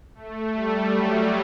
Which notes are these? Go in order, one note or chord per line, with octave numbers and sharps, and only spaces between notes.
A3
G3
F#3